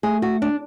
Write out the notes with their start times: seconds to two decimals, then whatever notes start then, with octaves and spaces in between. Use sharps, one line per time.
0.03 A3 G#4
0.22 F#4
0.42 D4